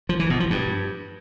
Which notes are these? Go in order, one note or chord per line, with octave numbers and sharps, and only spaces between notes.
F3
E3
B2
F3
G2